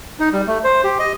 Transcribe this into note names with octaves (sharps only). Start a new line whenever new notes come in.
D#4
G3
A3
C5
G4
D#5